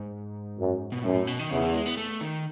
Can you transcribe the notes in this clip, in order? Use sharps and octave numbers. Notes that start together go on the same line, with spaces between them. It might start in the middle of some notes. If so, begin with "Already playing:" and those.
Already playing: G#2
F#2
B2
F#2 A2
B2
D#3
E2 C#3
E3
G#3
B3
A3
D#3